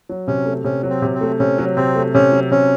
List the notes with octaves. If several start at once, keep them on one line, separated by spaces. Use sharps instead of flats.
F#3
C3 C#4
A3
C3 C#4
F#3
C4
C3
C4
A3
C3 C#4
F#3
C3 C4
A3
C3 C#4
F#3
C3 C#4